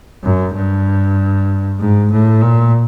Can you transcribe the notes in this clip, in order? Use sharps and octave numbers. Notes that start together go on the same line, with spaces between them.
F#2
G2
G#2
A2
A#2